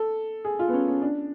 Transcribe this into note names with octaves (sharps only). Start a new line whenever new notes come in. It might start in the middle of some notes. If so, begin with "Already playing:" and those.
Already playing: A4
G#4
F4
B3
C#4
C#4
D4